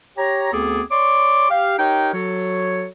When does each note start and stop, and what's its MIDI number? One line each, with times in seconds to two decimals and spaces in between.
0.17 0.51 67
0.17 0.51 73
0.17 0.51 82
0.52 0.82 38
0.52 0.82 59
0.52 0.82 60
0.52 0.82 68
0.52 0.82 69
0.52 0.82 86
0.91 1.48 73
0.91 1.48 74
0.91 1.48 84
0.91 1.48 86
1.49 1.75 67
1.49 1.75 77
1.78 2.09 63
1.78 2.09 67
1.78 2.09 70
1.78 2.09 73
1.78 2.09 79
2.13 2.86 54
2.13 2.86 66
2.13 2.86 69
2.13 2.86 73